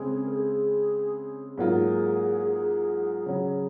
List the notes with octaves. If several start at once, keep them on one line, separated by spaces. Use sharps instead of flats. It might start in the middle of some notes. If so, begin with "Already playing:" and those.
Already playing: C#3 G#3 C4 G#4
A#4
G#4
G#2 F#3 A#3 F4 G#4
C#3 F#3 C#4